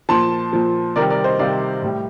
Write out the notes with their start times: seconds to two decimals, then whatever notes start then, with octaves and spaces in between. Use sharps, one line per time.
0.09 A#2 F3 A5 C6
0.53 A#2 F3
0.96 C3 D#3 G3 A#4 D5
1.10 A#4 D5
1.24 C5 D#5
1.39 C3 D#3 G3 D5 F5
1.82 A2 G3